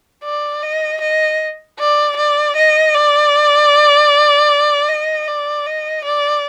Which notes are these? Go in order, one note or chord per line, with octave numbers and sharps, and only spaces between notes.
D5
D#5
D#5
D5
D5
D#5
D5
D#5
D5
D#5
D5